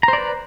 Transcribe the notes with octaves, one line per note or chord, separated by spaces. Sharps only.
B4 C5 D5 A#5